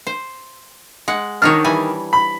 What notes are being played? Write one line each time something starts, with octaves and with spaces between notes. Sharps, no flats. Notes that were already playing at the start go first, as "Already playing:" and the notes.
C5
G#3 F#5
D#3 D4 D#4 C#5 F6
E3 G3 G#5
B5